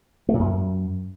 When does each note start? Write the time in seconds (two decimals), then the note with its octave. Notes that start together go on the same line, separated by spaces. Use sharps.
0.29 A3
0.34 A#2
0.39 F#2